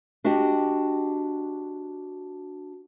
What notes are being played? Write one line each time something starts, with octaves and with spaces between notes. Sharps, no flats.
D4 F#4 G4 D#5 G5